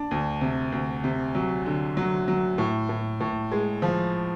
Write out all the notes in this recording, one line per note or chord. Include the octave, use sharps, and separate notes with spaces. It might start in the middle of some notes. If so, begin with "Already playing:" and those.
Already playing: D4
D2
C3
D2
C3
F#3
D3
F#3
F#3
A2
A2
A2
G#3
F3